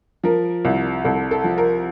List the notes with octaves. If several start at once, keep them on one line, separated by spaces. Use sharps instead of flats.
F3 A#4
C2
C2 A4
A4
F3
A#4